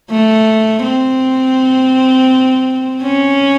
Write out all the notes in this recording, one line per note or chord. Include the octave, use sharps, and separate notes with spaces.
A3
C4
C#4